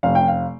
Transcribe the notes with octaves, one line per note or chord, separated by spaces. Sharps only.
F1 F5
G5
F5